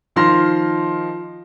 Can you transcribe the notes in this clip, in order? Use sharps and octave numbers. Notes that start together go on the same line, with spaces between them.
D#3 F3 C6 F6 A#6